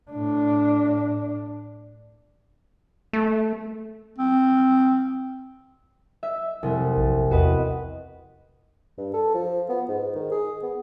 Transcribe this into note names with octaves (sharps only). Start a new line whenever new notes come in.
A2 D4
A3
C4
E5
F1 C2
A#1
E2 F#4 B4 D#5
G2
A4
F3
B3
G#2
D#3
G#4
B3